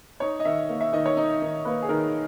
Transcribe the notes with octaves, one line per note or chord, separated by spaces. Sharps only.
D#4 C#5
D#5
D#3 E5
A#3
E5
D#3 D#5
C#5
D#4
D#3
A#3 B4
G#4
D#3 A#4